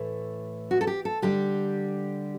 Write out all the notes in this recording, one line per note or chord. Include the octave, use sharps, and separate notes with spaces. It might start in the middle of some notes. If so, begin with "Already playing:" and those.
Already playing: A2 E3 A3
F#4
A4
G4
A4
D3 G3 G4